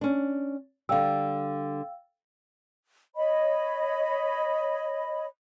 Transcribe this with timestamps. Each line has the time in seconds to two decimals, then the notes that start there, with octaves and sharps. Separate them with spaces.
0.01 C#4 D4
0.89 D3 G3 F5 G5 E6
3.16 C#5 D#5 B5